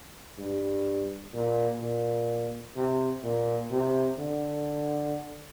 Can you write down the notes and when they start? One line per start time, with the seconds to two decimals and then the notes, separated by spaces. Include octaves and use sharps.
0.38 G2
1.34 A#2
1.81 A#2
2.76 C3
3.23 A#2
3.71 C3
4.19 D3